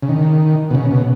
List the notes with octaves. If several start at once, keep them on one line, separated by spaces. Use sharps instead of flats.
C#3
D#3
B2
C#3
B2